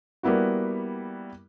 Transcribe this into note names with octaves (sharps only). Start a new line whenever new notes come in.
G3 A#3 B3 E4 F#4